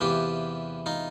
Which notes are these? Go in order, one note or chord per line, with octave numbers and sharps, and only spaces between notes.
E2 C3 E3 F4 G4
D#4 F4